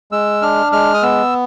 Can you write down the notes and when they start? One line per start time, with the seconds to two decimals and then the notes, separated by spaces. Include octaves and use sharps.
0.12 G#3 E6
0.42 D4 F6
0.72 G#3 F6
0.94 D#6
1.02 B3 E6